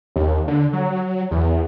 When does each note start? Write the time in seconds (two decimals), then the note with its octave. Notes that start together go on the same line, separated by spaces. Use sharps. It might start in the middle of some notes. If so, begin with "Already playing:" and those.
0.16 D#2
0.48 D3
0.73 F#3
1.31 E2